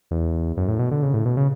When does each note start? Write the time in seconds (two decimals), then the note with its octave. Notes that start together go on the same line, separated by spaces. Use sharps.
0.11 E2
0.57 F#2
0.68 A2
0.79 B2
0.91 D3
1.02 C#3
1.14 A2
1.26 B2
1.37 C#3